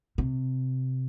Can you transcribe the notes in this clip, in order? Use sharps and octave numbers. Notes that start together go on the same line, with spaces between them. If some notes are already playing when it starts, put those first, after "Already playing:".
C3